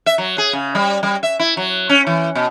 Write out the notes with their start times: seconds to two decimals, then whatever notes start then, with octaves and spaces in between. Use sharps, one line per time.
0.06 E5
0.18 F#3
0.38 G#4
0.53 C#3
0.75 G3
1.03 G3
1.23 E5
1.40 E4
1.57 F#3
1.89 C#4
2.07 E3
2.35 B2